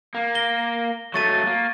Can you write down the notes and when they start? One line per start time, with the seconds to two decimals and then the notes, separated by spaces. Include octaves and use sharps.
0.15 A#3
0.35 A#6 G7
1.14 F#3 A3 C#6 A6 D#7
1.46 A#3